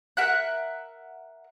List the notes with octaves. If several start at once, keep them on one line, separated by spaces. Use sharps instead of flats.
A#4 E5 F#5 F#6